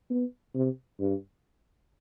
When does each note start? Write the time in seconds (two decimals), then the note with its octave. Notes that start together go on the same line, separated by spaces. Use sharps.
0.10 B3
0.54 C3
1.00 G2